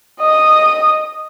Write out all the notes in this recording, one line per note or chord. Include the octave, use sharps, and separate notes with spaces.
D#5 D#6